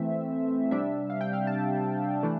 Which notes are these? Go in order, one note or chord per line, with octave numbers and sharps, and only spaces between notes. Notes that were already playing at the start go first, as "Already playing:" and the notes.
Already playing: E3 A3 C4 E5
C3 G3 D4 E5
F5
G5
F5
A5
E3 A3 D4